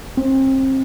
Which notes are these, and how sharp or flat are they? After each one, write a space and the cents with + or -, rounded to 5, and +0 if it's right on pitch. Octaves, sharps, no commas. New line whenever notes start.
C4 +30